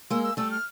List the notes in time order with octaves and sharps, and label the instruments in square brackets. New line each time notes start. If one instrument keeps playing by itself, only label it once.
[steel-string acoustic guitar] G#3 A#3 [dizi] E6
[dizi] E6
[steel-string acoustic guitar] G3 A3 [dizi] E6
[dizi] F6